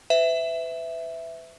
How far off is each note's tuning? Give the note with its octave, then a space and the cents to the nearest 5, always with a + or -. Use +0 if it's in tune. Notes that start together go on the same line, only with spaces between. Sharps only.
B4 +40 E5 +0